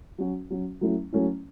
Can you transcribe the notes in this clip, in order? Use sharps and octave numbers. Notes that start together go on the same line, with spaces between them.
F#3 C#4 F#4
F#3 C#4 F#4
F#3 A3 C#4 E4
F#3 A3 C#4 E4